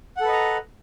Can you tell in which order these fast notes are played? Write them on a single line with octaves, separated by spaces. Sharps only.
F#5 A4 B4 D#5 A#5